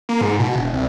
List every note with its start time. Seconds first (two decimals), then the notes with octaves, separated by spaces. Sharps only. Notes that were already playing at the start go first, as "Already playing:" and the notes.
0.09 A#3
0.21 G#2
0.39 B2
0.56 E1
0.73 C2